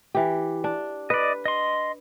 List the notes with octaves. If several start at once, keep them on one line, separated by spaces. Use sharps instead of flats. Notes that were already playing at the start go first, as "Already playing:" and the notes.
E3 G4
D4
B4 D5 D#5
D#5 C6